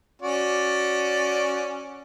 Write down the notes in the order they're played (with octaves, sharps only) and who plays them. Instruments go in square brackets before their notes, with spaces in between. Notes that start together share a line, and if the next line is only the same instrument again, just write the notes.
[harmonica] C#4 F#4 D5